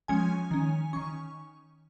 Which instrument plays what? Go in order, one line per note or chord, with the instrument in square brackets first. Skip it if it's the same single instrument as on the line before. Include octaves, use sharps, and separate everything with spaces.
[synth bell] F3 G#3 C#4 G#5
D#3 C#4
D#3 C#4 C#6